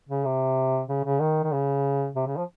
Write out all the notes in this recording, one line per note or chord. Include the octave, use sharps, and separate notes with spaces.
C#3
C3
C#3
C#3
D#3
D#3
C#3
C3
C#3
F3